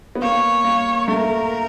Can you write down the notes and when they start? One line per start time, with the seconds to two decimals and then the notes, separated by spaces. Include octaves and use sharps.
0.15 B3
0.22 A#3 C#5
0.64 A#3
1.08 A3 A#4